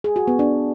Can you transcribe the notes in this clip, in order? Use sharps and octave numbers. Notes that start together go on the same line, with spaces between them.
G#4
F#4
B3
D4